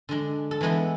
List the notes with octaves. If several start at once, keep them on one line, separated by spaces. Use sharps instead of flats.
D3 G#3 D4
A4
E3 G#3 B3 E4 B4